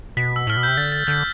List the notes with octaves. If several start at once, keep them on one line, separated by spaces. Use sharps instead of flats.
B2 B6
E6
A2 F6
B2
C3 G6
D3 A6
A6
D3 G6